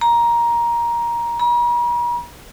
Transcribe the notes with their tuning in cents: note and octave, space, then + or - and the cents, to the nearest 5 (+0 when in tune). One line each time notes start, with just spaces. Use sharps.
A#5 +15
A#5 +45